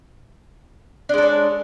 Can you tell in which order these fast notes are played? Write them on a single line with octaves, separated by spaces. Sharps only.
D4 G#3 A4 C#5